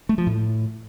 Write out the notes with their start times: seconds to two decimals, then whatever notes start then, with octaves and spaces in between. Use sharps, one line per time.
0.09 A3
0.18 F3
0.27 A2